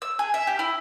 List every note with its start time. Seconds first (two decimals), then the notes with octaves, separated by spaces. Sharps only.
0.02 E6
0.19 G#4
0.34 E5
0.47 G4
0.59 E4